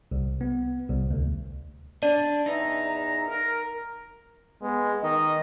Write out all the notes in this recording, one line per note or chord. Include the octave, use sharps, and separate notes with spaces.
C2
B3
C2
D2
D4 D5
E2 D#4 E5 A#5
A#4
G#3 B3
D#3 D#5